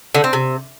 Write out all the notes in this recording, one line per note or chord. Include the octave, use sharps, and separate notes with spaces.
D3
C4
C3